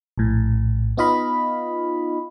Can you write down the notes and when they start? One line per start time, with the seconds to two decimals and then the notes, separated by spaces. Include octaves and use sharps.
0.18 A#1 A2
0.97 B3 D#4 F4 D#5 F5 B5